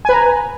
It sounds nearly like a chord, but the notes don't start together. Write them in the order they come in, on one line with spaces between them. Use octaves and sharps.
G#5 B4 A#5